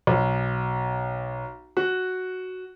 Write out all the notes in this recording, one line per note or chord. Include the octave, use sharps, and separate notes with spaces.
B1
F#4